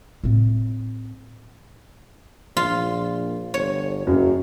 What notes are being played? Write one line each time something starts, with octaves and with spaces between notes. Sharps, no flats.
A2 C4
A#1 F4
G1 C#5
F#1 F#2